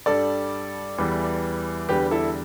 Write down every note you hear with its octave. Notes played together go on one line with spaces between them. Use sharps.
G2 G3 A4 D5
E2 E3 G3
E2 D3 G3 G4 B4
E4 A4